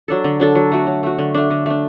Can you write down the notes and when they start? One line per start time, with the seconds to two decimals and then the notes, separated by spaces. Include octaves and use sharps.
0.08 F#3 D4 A4
0.24 D3
0.40 F#3 D4 A4
0.55 F#3
0.71 A3 F#4
0.87 F#3
1.03 A3 F#4
1.18 D3
1.34 A3 D4
1.50 D3
1.66 A3 D4